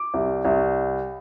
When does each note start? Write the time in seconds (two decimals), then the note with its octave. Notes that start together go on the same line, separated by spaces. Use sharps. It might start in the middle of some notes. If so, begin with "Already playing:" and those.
Already playing: D6
0.14 C2
0.45 C2